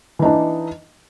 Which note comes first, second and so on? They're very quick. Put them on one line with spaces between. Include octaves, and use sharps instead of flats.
E3 D#4 D4